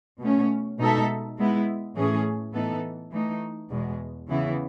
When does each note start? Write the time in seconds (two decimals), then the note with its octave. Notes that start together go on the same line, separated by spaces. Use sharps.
0.20 B2 A3 C#4
0.79 B2 G#3 D#4 A4 E5
1.38 G#3 B3 E4
1.95 A2 E3 A3 C#4 G#4
2.54 A2 E3 B3 D#4 A4
3.12 E3 A3 D#4
3.70 E2 B2 G#3
4.29 C#3 E3 B3 E4